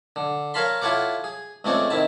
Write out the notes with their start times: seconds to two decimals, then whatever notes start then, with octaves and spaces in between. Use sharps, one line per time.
0.16 D3
0.54 A#4 C#5 F5 A5 B5 C6
0.82 E4 F4 A4 C#5 F#5 D6
1.24 G#4
1.64 C#2 G#3 A3 C4 C#5 D5
1.90 D#3 C4 E4 A5